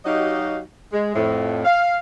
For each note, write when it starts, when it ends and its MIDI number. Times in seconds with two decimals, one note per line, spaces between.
0.05 0.60 54
0.05 0.60 63
0.05 0.60 66
0.05 0.60 67
0.05 0.60 75
0.05 0.60 77
0.93 1.11 56
1.15 1.62 41
1.15 1.62 45
1.65 1.97 77